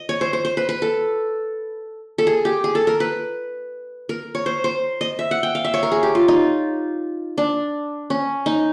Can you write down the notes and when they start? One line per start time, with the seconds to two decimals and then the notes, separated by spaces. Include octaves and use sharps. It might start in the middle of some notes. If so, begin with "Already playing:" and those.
Already playing: D#5
0.09 C#5
0.21 C5
0.33 C5
0.45 C5
0.57 B4
0.69 B4
0.82 A4
2.18 A4
2.27 G#4
2.45 G4
2.64 G#4
2.75 A4
2.87 A#4
3.00 B4
4.09 A#4
4.35 C#5
4.46 C5
4.64 C5
5.01 D#5
5.19 E5
5.31 F#5
5.43 G5
5.55 F5
5.65 E5
5.74 C#5
5.83 A#4
5.92 G#4
6.03 G4
6.15 F4
6.28 D#4
7.38 D4
8.10 C#4
8.46 D#4